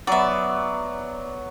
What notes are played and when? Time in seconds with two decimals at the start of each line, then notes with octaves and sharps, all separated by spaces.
0.07 F#3 B3 D5 E5